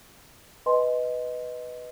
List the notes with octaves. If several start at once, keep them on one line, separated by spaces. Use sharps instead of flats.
B4 D#5 G#5 C6